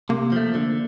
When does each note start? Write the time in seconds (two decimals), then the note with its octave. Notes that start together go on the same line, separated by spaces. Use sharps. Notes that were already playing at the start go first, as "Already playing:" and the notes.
0.09 C3 A#3
0.32 F3 A3
0.55 D3